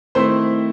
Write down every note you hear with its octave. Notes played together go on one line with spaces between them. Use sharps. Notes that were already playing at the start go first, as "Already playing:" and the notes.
D#3 A3 C4 E4 C5 C6